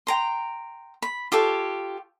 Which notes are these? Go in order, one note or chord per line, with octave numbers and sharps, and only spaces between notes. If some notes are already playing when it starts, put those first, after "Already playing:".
G5 A#5 C6
B5
F4 G4 A4 C#5